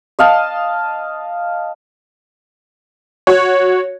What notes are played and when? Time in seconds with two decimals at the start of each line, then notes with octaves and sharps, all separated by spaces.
0.19 D#5 F5 A5
3.27 F#4 C#5